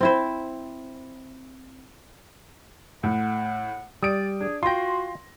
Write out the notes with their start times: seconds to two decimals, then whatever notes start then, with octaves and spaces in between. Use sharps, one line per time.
0.01 C4 E4 C5
3.03 A2 F#5
4.03 G3 D5 D#6 D7
4.40 D4 G#4
4.63 F4 F#4 G5 C6 A#6